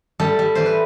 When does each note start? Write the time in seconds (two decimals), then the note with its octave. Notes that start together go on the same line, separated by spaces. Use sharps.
0.20 G3 A4
0.39 G3
0.55 E3 C5
0.66 B4